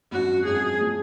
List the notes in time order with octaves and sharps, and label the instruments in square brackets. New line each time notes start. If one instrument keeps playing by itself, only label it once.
[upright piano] G#1 F#2 F3 [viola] F#4
[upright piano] G#1 F#2 F3 [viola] G#4
[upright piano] F3 G#3